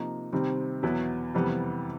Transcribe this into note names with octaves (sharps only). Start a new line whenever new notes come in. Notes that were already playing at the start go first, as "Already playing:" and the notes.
Already playing: C3 F3 A#3 D#4
C3 D#3 G3 C4
E2 B2 F#3 B3 E4
F2 C3 E3 G3 B3